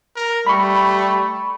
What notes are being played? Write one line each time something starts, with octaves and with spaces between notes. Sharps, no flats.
A#4
G3 A3 B5 C#6